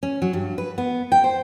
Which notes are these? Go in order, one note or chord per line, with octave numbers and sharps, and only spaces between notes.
C#4
F#3
G2
B4
B3
G5
C5